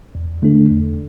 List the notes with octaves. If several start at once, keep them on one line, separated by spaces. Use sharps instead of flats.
E2
D3 A3 D4 A4
E2